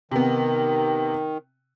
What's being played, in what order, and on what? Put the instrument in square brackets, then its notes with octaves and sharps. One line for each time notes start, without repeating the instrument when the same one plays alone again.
[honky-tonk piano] C3 B3 [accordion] D#3